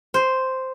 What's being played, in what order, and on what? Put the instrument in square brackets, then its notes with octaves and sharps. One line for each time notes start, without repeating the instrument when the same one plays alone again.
[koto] C5